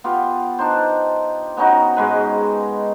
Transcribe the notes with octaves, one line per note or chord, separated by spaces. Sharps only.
B3 F4 G4
D4 D#4 C5
B3 C#4 D#4 F#4
G#2 G#3 B4